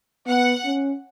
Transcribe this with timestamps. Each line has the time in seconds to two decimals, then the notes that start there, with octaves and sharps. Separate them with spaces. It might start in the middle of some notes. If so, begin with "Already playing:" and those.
0.27 B3 F#5
0.65 C#4